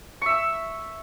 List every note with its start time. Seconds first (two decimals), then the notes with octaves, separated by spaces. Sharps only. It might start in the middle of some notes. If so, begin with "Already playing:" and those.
0.22 C#6
0.26 E5
0.30 E6